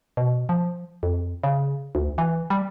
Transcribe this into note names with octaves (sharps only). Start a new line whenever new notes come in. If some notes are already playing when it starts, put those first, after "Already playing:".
B2
F3
F2
C#3
D2
E3
G3